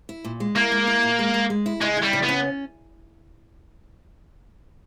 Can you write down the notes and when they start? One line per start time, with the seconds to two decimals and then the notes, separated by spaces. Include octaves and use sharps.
0.09 E4
0.25 A#2
0.40 G#3
0.56 A#3 E4
0.72 G#3
0.87 E4
1.03 A#2
1.19 G#3
1.34 G#3
1.50 G#3
1.66 E4
1.81 C#3 G#3
1.97 E4
2.02 G3
2.13 C#3
2.23 B3
2.29 C#4